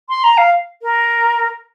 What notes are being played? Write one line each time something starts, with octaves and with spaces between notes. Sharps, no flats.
C6
A#5
F5
A#4